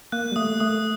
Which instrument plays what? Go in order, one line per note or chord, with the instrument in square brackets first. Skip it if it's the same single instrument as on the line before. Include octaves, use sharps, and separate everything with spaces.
[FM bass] A#3 [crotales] F#6
[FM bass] G3
[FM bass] A3 [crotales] D#6
[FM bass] A3 [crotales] D#6